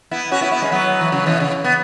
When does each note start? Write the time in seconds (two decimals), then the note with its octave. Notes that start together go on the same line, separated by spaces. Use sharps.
0.11 B3 E4
0.32 C#4 F#4
0.41 B3 E4
0.52 B3 E4
0.62 G#3 C#4
0.72 F#3 B3
1.01 E3
1.12 C#3 F#3
1.26 B2 E3
1.40 C#3
1.64 B3